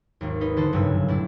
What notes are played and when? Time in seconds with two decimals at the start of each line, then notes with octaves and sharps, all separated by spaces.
0.21 G#1 D#2
0.40 D#4 B4
0.57 D3 E3 A4 C5
0.72 F#1 B1 G2 C#3 G#5 E6
1.08 A2 D4 E4